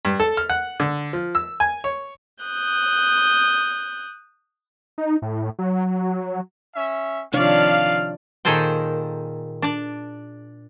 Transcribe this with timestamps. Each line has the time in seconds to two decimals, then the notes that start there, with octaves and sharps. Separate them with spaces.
0.05 G2
0.20 A4
0.37 F6
0.50 F#5
0.80 D3
1.13 F3
1.35 E6
1.60 G#5
1.84 C#5
2.43 D#6 F#6 G6
4.98 D#4
5.22 A2
5.59 F#3
6.75 C#4 E5
7.33 C3 D#3 F3 D4 C#5 D5 F5
8.45 A#2 D#3 G#4 A4 C5 G5
9.62 D4 D5